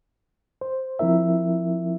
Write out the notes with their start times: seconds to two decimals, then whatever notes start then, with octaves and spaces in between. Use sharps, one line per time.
0.61 C5
0.99 F3 C4 E4 A#4 E5